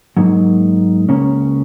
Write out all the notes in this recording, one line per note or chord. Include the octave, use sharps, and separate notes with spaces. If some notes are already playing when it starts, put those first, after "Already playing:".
G#2 F#3 A#3 D#4
C#2 C#3 A#3 C#4